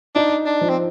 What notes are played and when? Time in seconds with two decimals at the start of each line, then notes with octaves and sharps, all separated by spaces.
0.15 D4 D#4
0.46 D4
0.61 F3
0.70 C4